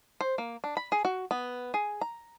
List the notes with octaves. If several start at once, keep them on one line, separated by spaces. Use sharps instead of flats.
C5
A#3
D4
B5
G#4
F#4
B3
G#4
A#5